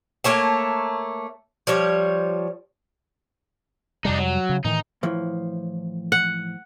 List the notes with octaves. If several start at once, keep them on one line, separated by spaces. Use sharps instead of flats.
A3 A#3 C#5 A5
F3 G3 C#5
F2 C3 G3 D4 D#4
F#3
C#3
A2 D#3 E3 D#4
A2 E3 F3
F#5